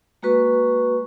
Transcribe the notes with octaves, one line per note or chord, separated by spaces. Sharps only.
G#3 A#3 F#4 B4 C#6